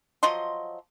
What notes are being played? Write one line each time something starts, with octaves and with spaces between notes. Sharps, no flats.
F3 F#3 D#5 C6